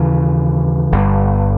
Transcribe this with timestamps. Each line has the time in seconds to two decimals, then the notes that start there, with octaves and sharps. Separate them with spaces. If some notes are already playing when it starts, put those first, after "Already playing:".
Already playing: D#2 C#3 E3
0.92 G1 G2 G3